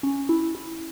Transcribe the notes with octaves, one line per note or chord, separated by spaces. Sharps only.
C#4
E4
E4